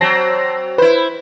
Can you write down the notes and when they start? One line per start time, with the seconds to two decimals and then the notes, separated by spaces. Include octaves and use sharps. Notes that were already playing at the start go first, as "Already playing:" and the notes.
0.01 F#3 C4 A5 A#6 C7
0.78 E4 B4 C5